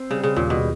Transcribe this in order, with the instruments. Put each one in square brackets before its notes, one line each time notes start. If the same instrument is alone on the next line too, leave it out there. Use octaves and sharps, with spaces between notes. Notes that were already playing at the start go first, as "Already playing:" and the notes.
Already playing: [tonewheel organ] C4
[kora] C#3 [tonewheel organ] G3
[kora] C#3
[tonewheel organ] D#2 [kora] A#2
[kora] B2